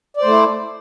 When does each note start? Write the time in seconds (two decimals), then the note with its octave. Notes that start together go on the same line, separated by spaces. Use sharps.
0.17 D5
0.21 C5
0.25 A3
0.29 E4